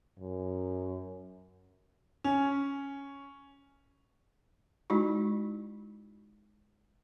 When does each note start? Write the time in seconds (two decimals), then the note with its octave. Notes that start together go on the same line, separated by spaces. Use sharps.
0.19 F#2
2.24 C#4
4.90 G#3 D#4 E4 F#4